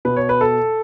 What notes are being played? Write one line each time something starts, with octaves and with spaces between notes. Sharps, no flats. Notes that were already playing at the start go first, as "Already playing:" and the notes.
B2 B4
C#5
B4
A4